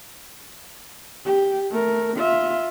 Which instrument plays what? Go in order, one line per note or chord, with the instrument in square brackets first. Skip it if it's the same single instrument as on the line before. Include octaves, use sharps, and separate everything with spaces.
[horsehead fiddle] G4
A3 A#4
F4 E5